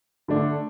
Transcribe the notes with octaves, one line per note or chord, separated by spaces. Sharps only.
D3 A3 D4